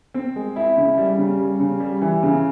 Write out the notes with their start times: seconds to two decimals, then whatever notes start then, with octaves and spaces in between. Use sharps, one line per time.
0.14 C4
0.36 G#3
0.56 E4
0.77 C#3
0.97 G3
1.18 C#3
1.39 G3
1.60 C#3
1.80 G3
2.02 E3
2.23 C#3